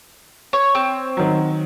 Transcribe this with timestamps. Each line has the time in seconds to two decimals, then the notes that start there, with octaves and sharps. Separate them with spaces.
0.53 C#5
0.75 C4
1.17 D#3 F#3